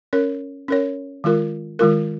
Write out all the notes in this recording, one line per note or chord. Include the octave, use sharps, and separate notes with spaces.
C#4 A#4 C#5
C#4 A#4 C#5
D#3 G#3 F4 A#4
D#3 G#3 F4 A#4